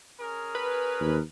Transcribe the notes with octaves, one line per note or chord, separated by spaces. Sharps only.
C#4 G#4 A#4
B4
D#2